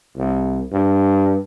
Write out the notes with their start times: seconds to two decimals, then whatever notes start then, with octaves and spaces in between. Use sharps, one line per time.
0.17 C2
0.72 G2